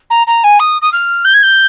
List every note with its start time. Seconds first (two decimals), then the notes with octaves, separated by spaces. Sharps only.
0.10 A#5
0.27 A#5
0.44 G#5
0.60 D#6
0.82 D#6
0.93 F6
1.25 G6
1.34 G#6
1.43 G6